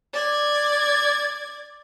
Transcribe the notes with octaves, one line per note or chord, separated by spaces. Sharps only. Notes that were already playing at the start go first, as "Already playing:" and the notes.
D5 G#6